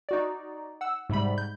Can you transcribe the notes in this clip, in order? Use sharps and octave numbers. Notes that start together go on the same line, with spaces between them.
D#4 F#4 D5
F#5 E6
G#2 C3 G3 B5
G6